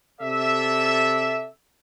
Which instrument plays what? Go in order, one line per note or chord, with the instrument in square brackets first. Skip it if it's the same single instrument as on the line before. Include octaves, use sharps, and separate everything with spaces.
[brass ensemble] C3 A4 D5 E5